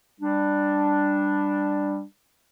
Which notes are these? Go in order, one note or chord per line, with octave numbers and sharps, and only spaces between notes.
G3 D4